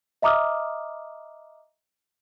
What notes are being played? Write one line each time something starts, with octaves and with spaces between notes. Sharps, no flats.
D#5 E5 A#5 D6 D#6 F6